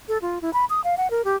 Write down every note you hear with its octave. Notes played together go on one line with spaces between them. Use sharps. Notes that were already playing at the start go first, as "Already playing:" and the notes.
A4
F4
E4
B5
D#6
F5
F#5
A#4
G4